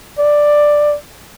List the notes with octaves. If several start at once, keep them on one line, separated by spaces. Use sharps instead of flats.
D5